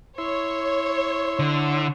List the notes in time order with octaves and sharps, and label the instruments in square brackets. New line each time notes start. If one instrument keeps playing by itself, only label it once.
[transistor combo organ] E4 C6 E6 [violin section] C#5
[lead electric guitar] D3